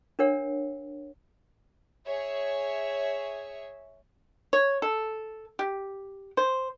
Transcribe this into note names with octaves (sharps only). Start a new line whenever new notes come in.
D4 A#4 C#5 F#5
G#4 C#5 E5
C#5
A4
G4
C5